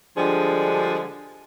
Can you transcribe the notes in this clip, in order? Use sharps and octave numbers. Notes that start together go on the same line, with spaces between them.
D3 F3 G3 G#3 D4 G#4